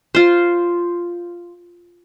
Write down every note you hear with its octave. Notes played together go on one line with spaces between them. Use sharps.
F4 C5